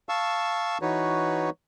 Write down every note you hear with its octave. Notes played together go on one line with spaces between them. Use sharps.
F5 A5 C#6 E6
E3 D#4 F#4 B4 C#5